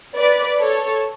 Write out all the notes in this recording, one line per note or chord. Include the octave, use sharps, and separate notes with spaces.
B4 D5
A4 C#5